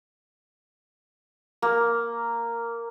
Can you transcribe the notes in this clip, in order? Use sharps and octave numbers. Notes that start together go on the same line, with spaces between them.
A#3